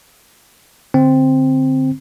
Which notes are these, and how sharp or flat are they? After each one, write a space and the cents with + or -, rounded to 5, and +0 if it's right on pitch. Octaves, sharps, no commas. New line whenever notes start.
D3 +0 C4 +0